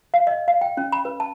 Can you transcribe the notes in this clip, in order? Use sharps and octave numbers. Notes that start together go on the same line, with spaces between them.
F5
D#5
F5
G5
C#4
B5
B4
A5